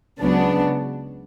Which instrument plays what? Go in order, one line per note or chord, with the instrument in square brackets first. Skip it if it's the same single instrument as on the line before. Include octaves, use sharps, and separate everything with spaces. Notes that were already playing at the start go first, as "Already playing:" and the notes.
[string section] C#2 C#3 F#3 B3 D4